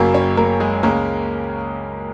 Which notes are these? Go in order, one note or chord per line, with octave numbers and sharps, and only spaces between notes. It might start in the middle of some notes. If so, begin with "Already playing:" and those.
Already playing: F#1 F#2 F#3 A#3 A#4
C#4 C#5
A#3 A#4
G#3 G#4
C#2 C#3 G#3 A#3 C#4 A#4